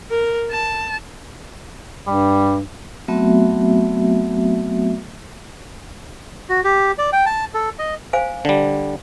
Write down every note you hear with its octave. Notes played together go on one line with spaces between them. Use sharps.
A#4
A5
G2 G3
F#3 A3 B3 C4 F#4 E5
F#4
G4
D5
G5
A5
A4
D#5
C5 F5 G#5
D3 G3